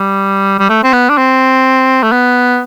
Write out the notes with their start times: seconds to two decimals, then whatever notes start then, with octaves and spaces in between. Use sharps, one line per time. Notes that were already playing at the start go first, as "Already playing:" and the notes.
Already playing: G3
0.59 G3
0.69 A3
0.84 C4
0.93 B3
1.10 D4
1.17 C4
2.03 A3
2.12 B3